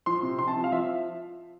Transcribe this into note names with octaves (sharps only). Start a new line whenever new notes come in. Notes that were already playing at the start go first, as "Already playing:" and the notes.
F3 C6
C3
C3 C6
A5
F3
F5
F3 E5